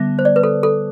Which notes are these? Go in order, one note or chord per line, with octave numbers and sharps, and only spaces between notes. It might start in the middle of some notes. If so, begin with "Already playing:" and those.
Already playing: D3 G3 B3 E5
C5
D5
B4
A4
A4